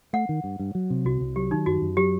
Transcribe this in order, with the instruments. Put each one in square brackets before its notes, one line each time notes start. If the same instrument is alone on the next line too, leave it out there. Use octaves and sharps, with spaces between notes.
[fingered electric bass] A3 [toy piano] F#5
[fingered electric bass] D#3
G2
G2
F#3
C3
[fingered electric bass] C2 [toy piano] F#4
[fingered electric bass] C2
[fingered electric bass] F#3 [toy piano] G4
[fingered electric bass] D#3 [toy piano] D#4
[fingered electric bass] F#2 [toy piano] F#4
[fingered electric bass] F#2
[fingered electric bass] F#3 [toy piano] G4